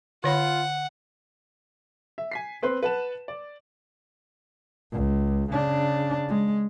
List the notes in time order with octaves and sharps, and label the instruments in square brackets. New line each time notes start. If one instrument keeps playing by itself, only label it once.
[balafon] D3 C#5 B5 [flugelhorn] F4 [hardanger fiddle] F#5
[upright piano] E5
G#5 B6 C7
C4 B4 C5 C6
B4 F#5 A5 E7
D5
[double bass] C#2
C#3 D4
G#3